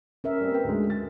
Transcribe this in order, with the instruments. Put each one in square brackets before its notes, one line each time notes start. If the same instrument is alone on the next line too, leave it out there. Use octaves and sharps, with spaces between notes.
[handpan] C#4 A#4 E5
[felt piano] G3 A#3 C4
B4 G5
D2 D3 G#3
A6